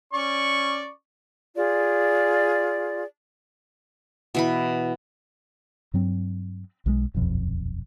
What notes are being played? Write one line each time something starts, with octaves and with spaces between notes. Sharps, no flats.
C#4 D5 C#6
F4 G#4 D5
B2 E3 B5
G2 F#3 C4
B1 F3 G#3
D#1 B1 F2